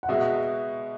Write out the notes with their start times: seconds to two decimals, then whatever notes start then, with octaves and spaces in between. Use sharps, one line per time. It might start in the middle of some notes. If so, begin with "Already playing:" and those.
0.03 F#5
0.08 B2 G#3 B3 F#4 E5